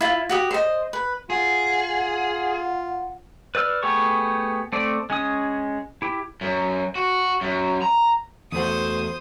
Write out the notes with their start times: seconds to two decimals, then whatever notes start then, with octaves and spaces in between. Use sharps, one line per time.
0.01 E4 F4
0.29 F#4 G4 D#6
0.51 C5 D#5
0.93 B4
1.30 F4 G#4 F#5
3.55 B4 D5 E6 F6
3.83 A3 B3 G4 G#4 C#6
4.72 A3 C4 D5
5.10 G#3 C#4 D#6
6.02 E4 G4
6.41 F#2
6.95 F#4
7.41 F#2
7.82 A#5
8.52 E2 A3 F#4 C5 D#6